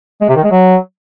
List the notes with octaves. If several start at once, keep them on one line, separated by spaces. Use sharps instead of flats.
G#3
C3
D#3
G#3
F#3